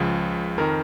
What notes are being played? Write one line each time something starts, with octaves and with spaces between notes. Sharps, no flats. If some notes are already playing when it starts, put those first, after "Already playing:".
Already playing: C#2 C#3 F3
F2 D#3 A#4